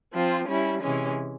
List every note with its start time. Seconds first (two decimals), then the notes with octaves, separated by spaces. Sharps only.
0.13 F3 C4 F4
0.47 G3 C#4 E4
0.81 C3 E3 G#3 C#4